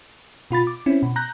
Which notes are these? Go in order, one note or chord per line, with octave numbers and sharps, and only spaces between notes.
B2 F4 B5 A6
D6
C4 C#4 E4
B2
A#5 F#6 G6 A#6